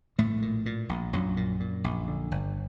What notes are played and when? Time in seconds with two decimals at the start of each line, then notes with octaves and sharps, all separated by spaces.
0.18 A#1 A2 A3
0.42 A#2
0.66 A#2
0.89 A#1
1.13 A#1 F#2 F#3
1.37 A#2
1.60 A#2
1.84 A#1
2.08 D3
2.31 G1